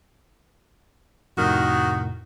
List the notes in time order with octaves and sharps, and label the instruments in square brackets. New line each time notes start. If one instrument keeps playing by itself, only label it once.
[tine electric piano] F2 A2 C3 [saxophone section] D#3 F#4